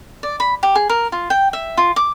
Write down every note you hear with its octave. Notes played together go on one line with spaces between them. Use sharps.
D5
B5
G4
G#4
A#4
F4
G5
E5
F4
D6